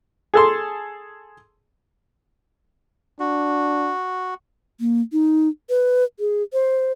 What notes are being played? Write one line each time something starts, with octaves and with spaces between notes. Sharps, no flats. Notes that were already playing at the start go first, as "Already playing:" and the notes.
G#4 A4 C6
D4 F#4
A#3
D#4
B4
G#4
C5